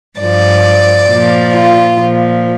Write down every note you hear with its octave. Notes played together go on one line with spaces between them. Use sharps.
G2 F3 D5
A#2 F3
F4
A#2 F3